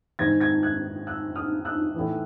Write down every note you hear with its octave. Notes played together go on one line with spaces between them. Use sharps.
G#2 D#3 G#6 A#6
G#6 A#6
F#6 G#6
E6 F#6
D#6 F6
E6 F#6
A2 E3